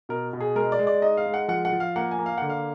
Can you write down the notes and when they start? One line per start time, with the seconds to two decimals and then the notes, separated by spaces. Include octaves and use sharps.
0.09 B2 A#4
0.33 B2
0.40 G#4
0.55 G#3 A#4
0.72 D5
0.79 G#3
0.87 D5
1.02 D#4 D#5
1.17 F5
1.26 G#3
1.34 F#5
1.48 F3 F#5
1.65 F#5
1.73 F3
1.80 F5
1.96 A#3 F#5
2.11 G#5
2.19 A#3
2.26 F5
2.38 D3 F#5
2.50 F5